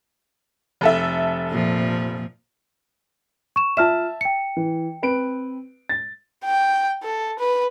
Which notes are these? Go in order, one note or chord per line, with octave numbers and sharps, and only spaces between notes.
F1 A4 E5
A#2 F3
C#6 E7
F4 E5 A5 F6 E7
G5 C#7
E3
C4 B4 D7
A6
G5
A4
B4